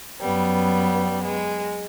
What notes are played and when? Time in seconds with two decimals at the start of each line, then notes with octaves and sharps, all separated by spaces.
0.20 F#2 G3 B3
1.24 G#3